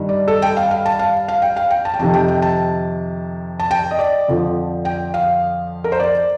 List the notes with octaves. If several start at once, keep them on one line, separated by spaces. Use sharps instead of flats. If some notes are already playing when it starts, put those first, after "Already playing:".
Already playing: G2 D#3
D5
A4
G5
F5
F5
A5
F5
F5
G5
F5
G5
A5
G5
F2 C3 D#3 A5
G5
G5
A5
A5
G5
D#5
D5
F2 D3 F3
G5
F5
A#4
C5
D5